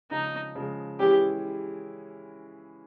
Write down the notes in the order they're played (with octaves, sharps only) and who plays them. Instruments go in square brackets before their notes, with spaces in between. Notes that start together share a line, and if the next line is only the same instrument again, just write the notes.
[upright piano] C#3 F3 G#3 [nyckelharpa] D#4
[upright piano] C#3 F3 G#3
[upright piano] E3 G#3 C#4 E4 [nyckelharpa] G4